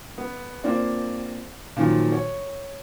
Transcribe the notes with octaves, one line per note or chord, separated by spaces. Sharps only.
B3
A#3 C4 D4 F4
A#2 D#3 F3 F#3
C#5